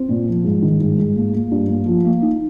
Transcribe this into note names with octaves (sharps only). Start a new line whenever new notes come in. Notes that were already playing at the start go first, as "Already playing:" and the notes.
Already playing: C4
A#2
F3
G#2
D#3
G#2
G#2
A#3
A#3
G2
A#3
F3
A#3
D#4